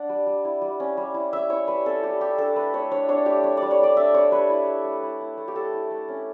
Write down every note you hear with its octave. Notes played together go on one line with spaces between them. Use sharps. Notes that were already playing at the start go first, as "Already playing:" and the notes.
Already playing: D4 F#5
G3
G3
E4
G3
C#4
G3
E4
G3 E5
E4 C#5
G3 B4
C#4 A4
G3 G4
E4 G4
D4 A4
A3 B4
A3 C#5
D4 C#5
D4 C#5
A3 G4
D4 C#5
G3 D5
C#5
G3 D5
D4 E5
D4 C#5
G3 B4
E4
A3
A3
E4
E4
A3
G4
A3 A4
E4
A3
C#4